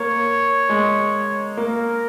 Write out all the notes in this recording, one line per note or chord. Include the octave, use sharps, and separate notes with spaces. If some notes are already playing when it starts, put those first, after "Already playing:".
Already playing: A#3 C#5
G#3
A#3 A#4